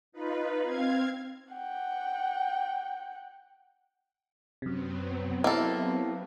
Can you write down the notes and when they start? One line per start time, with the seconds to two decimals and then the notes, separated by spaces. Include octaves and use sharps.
0.12 D#4 F4 B4
0.61 C4 F5 G#6
1.53 F#5 G5
4.62 F#2 C3 F#3 B3 C4
5.44 A#3 E4 G4 A4